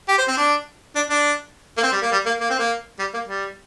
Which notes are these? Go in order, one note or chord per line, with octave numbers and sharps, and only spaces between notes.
G4
C5
C4
D4
D4
D4
A#3
C4
G3
A#3
G3
A#3
A#3
C4
A#3
G3
A#3
G3